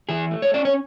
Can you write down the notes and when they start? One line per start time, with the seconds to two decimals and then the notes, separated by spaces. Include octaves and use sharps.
0.09 E3 G#4
0.31 A3
0.42 C#5
0.54 C#4 D5
0.65 C#5